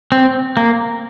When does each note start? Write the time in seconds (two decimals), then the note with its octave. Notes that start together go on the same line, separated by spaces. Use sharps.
0.12 C4
0.57 A#3